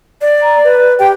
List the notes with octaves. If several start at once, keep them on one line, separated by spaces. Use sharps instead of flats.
D5
A#5
B4
G4 G5